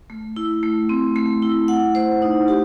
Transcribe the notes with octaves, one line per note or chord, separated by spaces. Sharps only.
A3
E4
A3
C4
A3
E4
F#5
C5
D#4
G4